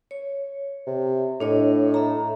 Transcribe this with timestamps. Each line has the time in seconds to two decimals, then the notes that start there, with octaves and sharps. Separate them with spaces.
0.11 C#5
0.87 C3
1.40 A2 D4 C#5 D#5
1.94 A4 E5 A#5